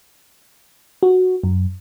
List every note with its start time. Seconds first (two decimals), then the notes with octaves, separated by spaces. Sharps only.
1.03 F#4
1.43 F#2